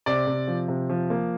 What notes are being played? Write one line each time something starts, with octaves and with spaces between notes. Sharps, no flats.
C3 D5
C3
F3
C3
F3
A#3